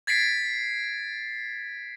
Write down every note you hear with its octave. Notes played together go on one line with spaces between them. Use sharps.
G#6 A6 B6 C7 D7